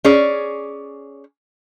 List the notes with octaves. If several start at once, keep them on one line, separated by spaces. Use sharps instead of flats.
C#4 G#4 D5